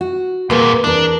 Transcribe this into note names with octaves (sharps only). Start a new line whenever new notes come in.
F#4
D#2 A#2 A#3 B3 G#4
E2 D4 A#4